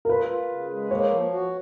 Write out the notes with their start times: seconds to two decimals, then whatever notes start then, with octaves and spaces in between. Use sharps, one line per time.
0.05 A#4
0.09 F4 B4
0.29 F4
0.50 C#3
0.71 G#3
0.91 A#3 C#5
1.11 F3
1.31 F#4